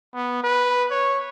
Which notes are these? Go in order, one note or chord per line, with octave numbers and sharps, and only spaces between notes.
B3
B4
C#5